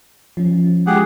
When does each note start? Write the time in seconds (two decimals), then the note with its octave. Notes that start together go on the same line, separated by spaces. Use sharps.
0.37 F3 C#4
0.87 G#3 F4 G4 G#4 F#5